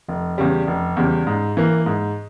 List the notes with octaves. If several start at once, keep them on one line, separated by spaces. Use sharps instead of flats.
F1
E2 C#3 G3
F1
E2 C#3 G3
G#2
E3 A#3
G#2